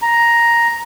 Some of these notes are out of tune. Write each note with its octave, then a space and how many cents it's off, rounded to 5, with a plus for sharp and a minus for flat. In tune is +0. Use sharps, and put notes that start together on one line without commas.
A#5 +5